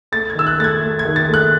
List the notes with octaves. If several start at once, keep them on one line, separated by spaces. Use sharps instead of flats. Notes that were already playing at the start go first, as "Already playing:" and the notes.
A3 A6
G#6
D#3 E6
F#6
A3 A6
G#6
A3
G#6
D#3
A6
A3
F#6